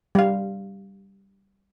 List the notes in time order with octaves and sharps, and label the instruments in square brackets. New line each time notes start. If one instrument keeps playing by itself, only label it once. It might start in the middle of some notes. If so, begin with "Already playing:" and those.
[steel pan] G3 F5